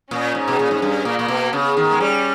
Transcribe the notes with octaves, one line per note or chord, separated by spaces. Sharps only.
A#2 C#4
G#2
B2
A#2
G#2
G2
A#2 A#3
A#2
B2
C#3 B3
D#3
G#3
G3 C#4